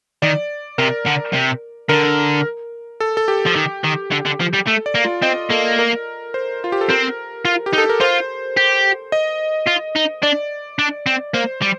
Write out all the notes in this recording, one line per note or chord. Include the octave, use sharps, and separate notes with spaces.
D#3 D5
C3 A#4
D3
C3
D3 A#4
A4
A4
G4
F3
D#3
D#3
D3
D3
F3
G3
A3 A4
D5
A#3
F4
C4 D#5
A#3 A4
A#4
C5
F4
G4
A4
C4 A#4
F4
G4
D#4
A4
A#4
F4 C5
G4
D#5
F4
D#4
D4 D5
D4
C4
A#3 C5
G3